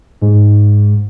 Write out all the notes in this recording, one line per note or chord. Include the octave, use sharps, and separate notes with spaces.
G#2